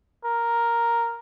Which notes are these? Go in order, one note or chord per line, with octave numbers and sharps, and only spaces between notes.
A#4